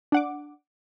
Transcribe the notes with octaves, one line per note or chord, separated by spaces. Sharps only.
D4 F#5 D6